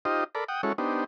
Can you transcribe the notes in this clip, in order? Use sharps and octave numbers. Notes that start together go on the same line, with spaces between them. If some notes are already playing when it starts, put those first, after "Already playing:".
D#4 F4 G4 C5 D#5
A4 A#4 D5 B5
F#5 G5 D#6
G#3 C#4 E4 F#4 A4 C#5
B3 D4 D#4 G4 C5